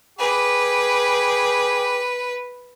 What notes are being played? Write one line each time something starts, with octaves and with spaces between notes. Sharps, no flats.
G#4 B4 G5 D6